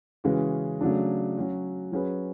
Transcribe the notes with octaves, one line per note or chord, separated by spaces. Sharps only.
C#3 E3 G#3 C#4 F#4
C#3 F#3 A3 D4
F#3 C#4 F#4
F#3 C#4 G#4 B4